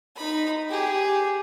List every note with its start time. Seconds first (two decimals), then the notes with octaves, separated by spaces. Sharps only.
0.16 D#4 B5
0.69 G4 G#4